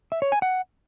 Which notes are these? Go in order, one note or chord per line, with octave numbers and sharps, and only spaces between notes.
E5
C#5
G#5
F#5